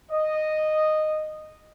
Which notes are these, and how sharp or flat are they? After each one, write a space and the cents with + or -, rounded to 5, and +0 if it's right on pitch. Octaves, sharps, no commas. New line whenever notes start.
D#5 -10